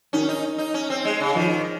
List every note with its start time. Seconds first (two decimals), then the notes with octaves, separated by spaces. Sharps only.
0.13 D#3 C#4
0.29 D#4
0.58 D#4
0.74 C#4
0.90 C4
1.05 G#3
1.20 C#3
1.35 D#3 F3